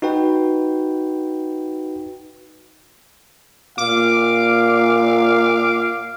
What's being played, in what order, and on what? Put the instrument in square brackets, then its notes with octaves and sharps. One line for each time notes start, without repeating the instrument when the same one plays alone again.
[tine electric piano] D#4 F#4 B4 G5
[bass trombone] A#2 [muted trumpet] F5 [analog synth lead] D6